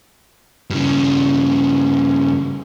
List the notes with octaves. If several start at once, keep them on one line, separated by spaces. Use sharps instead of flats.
G2 C#3